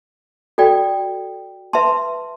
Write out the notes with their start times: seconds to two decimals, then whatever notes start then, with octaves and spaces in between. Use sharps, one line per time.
0.58 F#4 A4 D5 G5
1.73 B4 E5 A5 C6